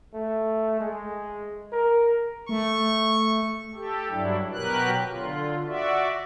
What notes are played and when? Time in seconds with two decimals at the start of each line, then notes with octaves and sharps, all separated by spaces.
0.14 A3
0.81 G#3
1.72 A#4
2.49 A3 C#6
3.75 G4 A4
4.09 G2 F#3 D4 E4
4.53 B2 F#3 G4 A#4 B4 F#6
5.09 D3 F4
5.67 F#4 D5 E5